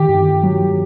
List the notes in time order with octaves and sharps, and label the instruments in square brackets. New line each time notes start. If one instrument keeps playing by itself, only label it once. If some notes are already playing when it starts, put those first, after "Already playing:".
Already playing: [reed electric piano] D#3 [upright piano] G4
[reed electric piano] G2
F#3